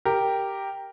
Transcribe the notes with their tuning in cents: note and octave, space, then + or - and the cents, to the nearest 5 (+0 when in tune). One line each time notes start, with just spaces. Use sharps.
G4 +0 A#4 -5